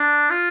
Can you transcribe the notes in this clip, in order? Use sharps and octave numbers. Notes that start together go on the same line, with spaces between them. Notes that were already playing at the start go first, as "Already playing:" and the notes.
Already playing: D4
F4